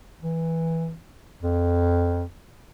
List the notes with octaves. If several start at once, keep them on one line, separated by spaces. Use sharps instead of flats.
E3
F2